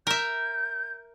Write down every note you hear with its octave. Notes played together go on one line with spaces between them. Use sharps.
A#4 E5 G6